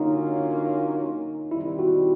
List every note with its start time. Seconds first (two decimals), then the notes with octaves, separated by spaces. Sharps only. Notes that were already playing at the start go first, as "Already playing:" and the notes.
Already playing: D3 F#3 A#3 C#4 D#4 F4
1.51 D#3 G3 C4 E4
1.79 F#4